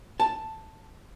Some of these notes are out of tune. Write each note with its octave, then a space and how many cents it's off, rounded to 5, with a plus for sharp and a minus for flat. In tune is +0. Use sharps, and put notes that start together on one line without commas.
A5 +5